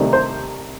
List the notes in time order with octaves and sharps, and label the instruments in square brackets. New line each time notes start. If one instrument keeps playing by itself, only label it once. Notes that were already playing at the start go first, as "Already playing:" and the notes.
Already playing: [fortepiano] C2 C3 D#3 A3
C5